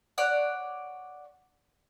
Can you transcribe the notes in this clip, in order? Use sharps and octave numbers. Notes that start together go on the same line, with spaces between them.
C#5 D5 F#5